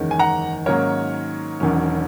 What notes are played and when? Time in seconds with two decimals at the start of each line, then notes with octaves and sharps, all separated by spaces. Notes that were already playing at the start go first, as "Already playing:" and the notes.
Already playing: F#1 E2 D#3 G#3 C#4
0.11 G#5
0.19 F#5 A#5
0.66 G#2 D#3 F#3 A#3 C#4 A#4 C#5
1.60 E1 E2 D#3 F#3 C#4